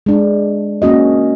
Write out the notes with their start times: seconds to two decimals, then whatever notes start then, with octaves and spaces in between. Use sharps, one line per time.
0.06 G#3 D4
0.82 A#3 C#4 F#4 D#5